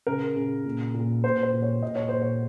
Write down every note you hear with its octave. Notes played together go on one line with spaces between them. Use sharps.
C#3 A#4
C#3
A#2
A#2
A#2 C5
C5
A#2
C#5
A#2 D#5
C#5
A#2 C5
C#5